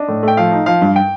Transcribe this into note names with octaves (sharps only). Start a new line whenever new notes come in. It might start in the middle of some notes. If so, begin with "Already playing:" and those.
Already playing: D4 D#5
A2
A3 G5
F3 F5
D#4
F3 F5
G2
G5